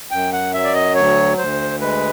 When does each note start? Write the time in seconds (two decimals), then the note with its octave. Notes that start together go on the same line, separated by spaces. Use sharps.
0.11 F#2 G5
0.32 F#5
0.54 F#3 E5
0.64 D5
0.74 D#5
0.95 D2 C#5
1.38 D2 C5
1.81 G#3 B4